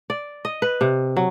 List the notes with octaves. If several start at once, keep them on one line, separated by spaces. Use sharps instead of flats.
D5
D#5
B4
C3
F#3